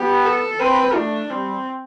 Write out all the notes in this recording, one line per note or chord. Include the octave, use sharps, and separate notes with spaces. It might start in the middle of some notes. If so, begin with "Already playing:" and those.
Already playing: B3 G4
A4
C4 B4
A3 D4
G3 C4